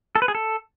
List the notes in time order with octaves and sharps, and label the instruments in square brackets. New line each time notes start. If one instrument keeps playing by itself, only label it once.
[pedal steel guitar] A4
B4
G#4
A4